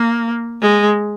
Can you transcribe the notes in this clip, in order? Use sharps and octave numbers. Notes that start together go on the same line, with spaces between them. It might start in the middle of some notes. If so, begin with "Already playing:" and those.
Already playing: A#3
G#3